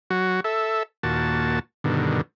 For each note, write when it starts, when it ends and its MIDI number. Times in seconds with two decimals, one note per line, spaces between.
0.10 0.40 54
0.10 0.40 66
0.44 0.83 69
0.44 0.83 76
1.03 1.59 39
1.03 1.59 46
1.03 1.59 66
1.03 1.59 81
1.84 2.21 43
1.84 2.21 47
1.84 2.21 50
1.84 2.21 51